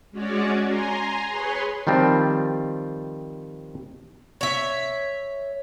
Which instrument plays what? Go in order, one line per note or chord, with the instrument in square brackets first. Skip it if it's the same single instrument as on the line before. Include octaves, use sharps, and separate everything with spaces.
[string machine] G#3 C#4 F#4 C#5 D5
G#5 A#5 C6
G#4 B4 C#5 C6
[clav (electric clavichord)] D#3 F3 G3 C4
[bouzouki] C#5 E5